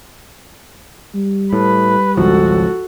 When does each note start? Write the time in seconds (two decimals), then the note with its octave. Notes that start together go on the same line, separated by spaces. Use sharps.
1.15 G3
1.53 A2 B4
2.17 G#1 C#2 F3 F#4 A4